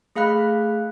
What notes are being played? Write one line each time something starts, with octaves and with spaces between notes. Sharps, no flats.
A3 G#4 F5 B5 F#6